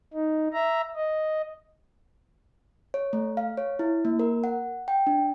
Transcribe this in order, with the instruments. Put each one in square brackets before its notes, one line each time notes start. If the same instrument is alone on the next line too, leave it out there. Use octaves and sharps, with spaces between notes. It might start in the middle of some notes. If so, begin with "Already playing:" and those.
[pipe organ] D#4
E5 A#5
D#5
[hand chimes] C#5
A3
F5
C#5
E4
A#3
A#4
F#5
G5
D4